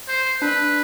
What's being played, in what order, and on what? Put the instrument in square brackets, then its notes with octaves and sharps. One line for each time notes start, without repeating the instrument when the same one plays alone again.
[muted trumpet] C5
[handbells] D4 [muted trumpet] B4